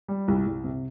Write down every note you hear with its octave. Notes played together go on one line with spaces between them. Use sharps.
G3
C2
C2
C3